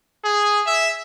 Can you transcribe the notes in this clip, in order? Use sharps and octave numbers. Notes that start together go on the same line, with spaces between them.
G#4
E5